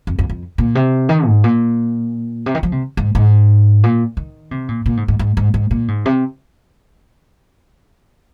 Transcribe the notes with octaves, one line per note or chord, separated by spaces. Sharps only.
F2
F2
F2
A#2
C3
D#3
G#2
A#2
C3
D#3
F3
C3
G#2
G#2
A#2
D#3
C3
A#2
A#2
G#2
G#2
G#2
G#2
G#2
A#2
G#2
C3